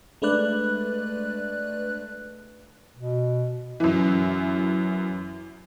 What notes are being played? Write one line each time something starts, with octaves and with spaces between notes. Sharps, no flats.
G#3 A3 D4 B4 D5 F#6
B2
F#2 E3